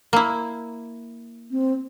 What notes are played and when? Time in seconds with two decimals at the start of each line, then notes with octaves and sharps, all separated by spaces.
0.13 A#3 E4
1.51 C4